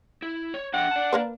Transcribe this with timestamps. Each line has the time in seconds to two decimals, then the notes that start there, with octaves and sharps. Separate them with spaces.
0.22 E4
0.54 C#5
0.74 D4 E5 F#5 G5
0.91 D5 A5
1.13 A#3 A#4 B4